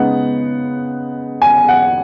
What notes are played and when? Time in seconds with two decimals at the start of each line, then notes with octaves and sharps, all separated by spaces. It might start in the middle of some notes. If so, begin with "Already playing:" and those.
Already playing: C#3 G#3 B3 D#4 F#5
1.42 G#5
1.69 F#5